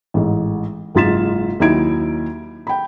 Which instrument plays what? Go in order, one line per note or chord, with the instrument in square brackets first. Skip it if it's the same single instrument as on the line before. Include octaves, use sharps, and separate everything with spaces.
[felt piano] A1 G#2
F#1 G#2 F4 A6 B6 E7
D#2 F#3 D#4 E4 G#6 D7
G5 B5